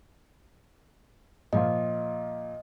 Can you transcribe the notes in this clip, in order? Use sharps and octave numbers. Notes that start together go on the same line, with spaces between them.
A#2 F3 F4 D#5